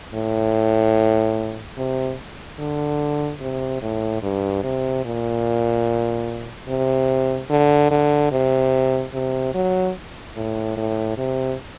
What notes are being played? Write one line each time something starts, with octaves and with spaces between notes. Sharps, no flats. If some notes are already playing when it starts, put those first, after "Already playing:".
A2
C3
D3
C3
A2
G2
C3
A#2
C3
D3
D3
C3
C3
F#3
A2
A2
C3